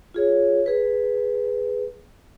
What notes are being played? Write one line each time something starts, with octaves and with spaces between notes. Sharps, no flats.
F4 G#4 C#5
G#4 B4